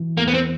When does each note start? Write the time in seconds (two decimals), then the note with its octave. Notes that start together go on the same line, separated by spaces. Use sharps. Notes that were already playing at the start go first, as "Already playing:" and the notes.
Already playing: E3
0.17 E2 A#3
0.28 B3
0.34 C4